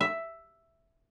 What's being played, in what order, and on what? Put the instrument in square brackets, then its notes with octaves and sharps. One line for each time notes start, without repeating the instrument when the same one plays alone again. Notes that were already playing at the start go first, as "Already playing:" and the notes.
[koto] E5